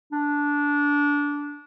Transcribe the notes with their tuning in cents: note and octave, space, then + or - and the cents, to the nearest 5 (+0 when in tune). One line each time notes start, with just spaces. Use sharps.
D4 -15